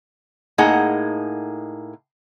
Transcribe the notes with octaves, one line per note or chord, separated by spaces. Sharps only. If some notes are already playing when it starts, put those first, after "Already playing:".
A2 A#3 D#4 G#4 F#5 A#5